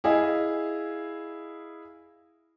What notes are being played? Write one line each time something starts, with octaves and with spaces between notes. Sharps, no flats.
E4 G#4 D#5 F5